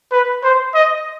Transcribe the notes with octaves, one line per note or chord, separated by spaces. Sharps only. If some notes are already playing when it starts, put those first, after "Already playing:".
B4
C5
D#5